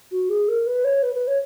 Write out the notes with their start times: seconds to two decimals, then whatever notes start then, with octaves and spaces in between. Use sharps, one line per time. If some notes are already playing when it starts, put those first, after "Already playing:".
0.12 F#4
0.30 G#4
0.48 A#4
0.67 B4
0.85 C#5
1.03 B4
1.15 B4
1.27 C#5